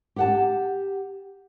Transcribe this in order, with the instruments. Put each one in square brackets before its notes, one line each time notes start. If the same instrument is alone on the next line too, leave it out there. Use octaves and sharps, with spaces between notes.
[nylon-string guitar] G4 F#5 A5